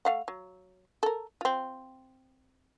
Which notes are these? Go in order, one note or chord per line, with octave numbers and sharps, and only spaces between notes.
A3 F5 F#5
F#3
A4 A#4
C4 F4